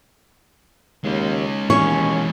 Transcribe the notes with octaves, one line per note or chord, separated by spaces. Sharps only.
D#2 G#3 C#4
D#2 E3 G#3 C#4 C#5